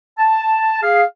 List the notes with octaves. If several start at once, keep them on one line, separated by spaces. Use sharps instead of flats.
A5
G#4 F5